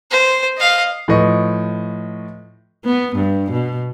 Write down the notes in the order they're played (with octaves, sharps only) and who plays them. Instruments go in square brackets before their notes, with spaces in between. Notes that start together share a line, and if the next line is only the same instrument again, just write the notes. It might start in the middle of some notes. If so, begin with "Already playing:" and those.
[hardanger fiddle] C5
D#5 F5
[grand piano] A2 F3 B4 D#5 C#6
[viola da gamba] B3
G2
B2